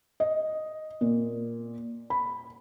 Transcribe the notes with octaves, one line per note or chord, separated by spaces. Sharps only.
D#5
A#2
B5